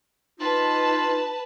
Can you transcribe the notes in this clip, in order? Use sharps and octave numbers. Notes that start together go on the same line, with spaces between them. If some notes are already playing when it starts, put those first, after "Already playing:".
D#4 F4 B4 A5